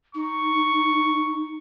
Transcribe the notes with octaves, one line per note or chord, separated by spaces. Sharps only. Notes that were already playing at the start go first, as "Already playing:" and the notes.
D#4 C#6